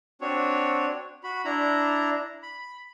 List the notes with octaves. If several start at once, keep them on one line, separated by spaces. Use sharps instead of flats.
C4 D4 F#4 C#5
F#4 B5
D4 E4 A#5
B5